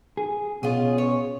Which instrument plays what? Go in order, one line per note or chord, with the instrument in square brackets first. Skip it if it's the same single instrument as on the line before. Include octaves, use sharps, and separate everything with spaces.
[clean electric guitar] G#4
[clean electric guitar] B2 [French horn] C#4 [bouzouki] F4 G#4
[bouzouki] C#5